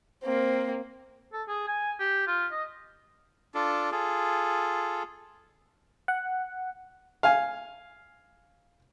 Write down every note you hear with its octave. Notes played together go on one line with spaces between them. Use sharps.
A#3 C4
A4
G#4
G#5
G4
F4
D#5
D4 F4 A4
F4 G#4 A4
F#5
F5 G#5